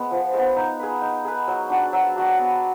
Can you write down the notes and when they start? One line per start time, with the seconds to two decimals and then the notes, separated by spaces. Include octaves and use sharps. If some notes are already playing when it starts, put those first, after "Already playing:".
Already playing: G#3 B3
0.11 F3
0.34 G#3 B3
0.56 D#4
0.80 G#4 B4
1.02 D#4
1.25 G#4 B4
1.47 F#3
1.70 D4 F#4 D5
1.93 F#3
2.16 D4 F#4 D5
2.38 B3